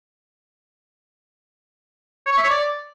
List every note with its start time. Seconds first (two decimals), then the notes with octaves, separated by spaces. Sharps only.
2.26 C#5
2.32 C#6
2.38 E5
2.44 C#5
2.50 D5